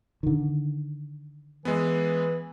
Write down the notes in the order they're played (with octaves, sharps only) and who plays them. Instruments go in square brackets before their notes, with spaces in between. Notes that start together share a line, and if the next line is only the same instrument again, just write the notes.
[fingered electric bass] D3 D#3
[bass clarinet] E3 [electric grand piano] G#3 B3